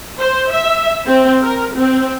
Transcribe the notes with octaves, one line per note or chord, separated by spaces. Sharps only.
C5
E5
C4
A#4
C4